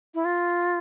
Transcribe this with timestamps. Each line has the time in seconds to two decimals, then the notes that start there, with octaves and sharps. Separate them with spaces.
0.14 E4
0.25 F4